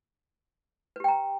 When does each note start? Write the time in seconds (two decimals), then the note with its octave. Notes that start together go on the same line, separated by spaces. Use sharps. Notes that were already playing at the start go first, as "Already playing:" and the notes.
0.96 B4
1.00 G4
1.04 G5
1.08 A#5